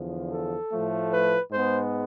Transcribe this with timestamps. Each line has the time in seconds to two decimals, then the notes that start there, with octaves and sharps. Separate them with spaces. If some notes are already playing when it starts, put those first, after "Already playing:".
Already playing: E2 D3 F3
0.31 A4
0.72 A2 F3 A3
1.11 B4
1.51 G#2 G#3 B3 C5